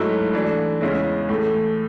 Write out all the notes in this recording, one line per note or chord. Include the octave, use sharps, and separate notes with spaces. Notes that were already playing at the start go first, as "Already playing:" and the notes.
Already playing: G#2 F#3 A3 E4
E3 A3 D4
E2 C#3 G#3 C#4 E4
A2 E3 A3